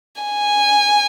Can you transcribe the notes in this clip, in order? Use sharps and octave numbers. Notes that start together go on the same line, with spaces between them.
G#5